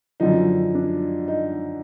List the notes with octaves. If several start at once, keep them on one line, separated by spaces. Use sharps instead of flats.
F#2 D3 F3 D#4
D4
D#4